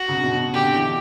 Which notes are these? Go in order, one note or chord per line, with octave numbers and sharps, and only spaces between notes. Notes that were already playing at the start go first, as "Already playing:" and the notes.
Already playing: F#4
C#3
B2
C#3
D3 G4
E3